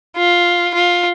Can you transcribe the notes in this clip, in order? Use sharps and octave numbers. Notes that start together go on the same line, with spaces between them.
F4
F4